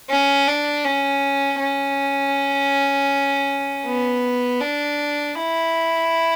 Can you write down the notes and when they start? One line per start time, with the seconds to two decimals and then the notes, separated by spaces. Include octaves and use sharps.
0.10 C#4
0.48 D4
0.85 C#4
1.60 C#4
3.86 B3
4.61 D4
5.35 E4